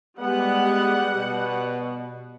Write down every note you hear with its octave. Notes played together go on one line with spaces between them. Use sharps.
G3 G#3 B3 F#5
B2